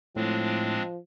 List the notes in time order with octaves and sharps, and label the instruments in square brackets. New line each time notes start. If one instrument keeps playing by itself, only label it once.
[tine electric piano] A2 [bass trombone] F3 [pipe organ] G#3 C4 D4